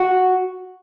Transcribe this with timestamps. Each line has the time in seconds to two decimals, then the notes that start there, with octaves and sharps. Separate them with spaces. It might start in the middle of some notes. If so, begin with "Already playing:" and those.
Already playing: F#4